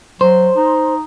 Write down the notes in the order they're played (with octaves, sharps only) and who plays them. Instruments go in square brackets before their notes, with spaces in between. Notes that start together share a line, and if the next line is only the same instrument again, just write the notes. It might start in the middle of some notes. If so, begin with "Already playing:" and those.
[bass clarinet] F#3 [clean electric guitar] C5
[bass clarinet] D#4